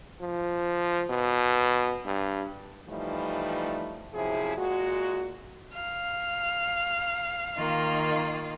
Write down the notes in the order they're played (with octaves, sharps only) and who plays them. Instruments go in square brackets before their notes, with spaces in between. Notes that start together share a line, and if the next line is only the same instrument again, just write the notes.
[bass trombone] F3
B2
G2
[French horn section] E3 F3 G3 A3 D#4
F#2 C3 F3 E4 G#4
A#2 G#3 F#4
[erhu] F5
[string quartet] D#3 A#3 F4